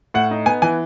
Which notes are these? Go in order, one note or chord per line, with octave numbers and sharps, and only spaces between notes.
A2 F#5
D#4
B3 G#5
E3 G#5